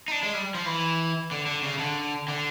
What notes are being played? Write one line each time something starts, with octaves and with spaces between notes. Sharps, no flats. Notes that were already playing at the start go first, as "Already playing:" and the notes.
D#4
D4
G#3
G3
F3
E3
D3
D3
C#3
D3
D3